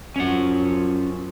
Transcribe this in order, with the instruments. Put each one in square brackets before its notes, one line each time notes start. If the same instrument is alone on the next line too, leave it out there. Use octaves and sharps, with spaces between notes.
[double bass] F#2 F3 [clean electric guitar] C#4 F#5